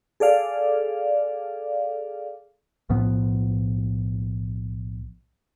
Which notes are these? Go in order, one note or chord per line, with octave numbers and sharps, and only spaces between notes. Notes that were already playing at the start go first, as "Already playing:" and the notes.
G#4 A4 D5 F5
B1 A2 F3 B3